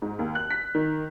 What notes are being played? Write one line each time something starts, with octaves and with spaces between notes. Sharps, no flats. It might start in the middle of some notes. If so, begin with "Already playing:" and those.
G#2
D#2
F#6
B6
D#3